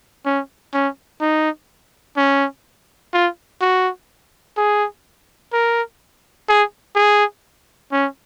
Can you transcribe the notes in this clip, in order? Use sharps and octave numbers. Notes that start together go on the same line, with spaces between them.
C#4
C#4
D#4
C#4
F4
F#4
G#4
A#4
G#4
G#4
C#4